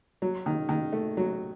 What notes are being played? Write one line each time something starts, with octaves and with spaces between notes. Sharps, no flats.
F#3
D#3
D#3
A3
F#3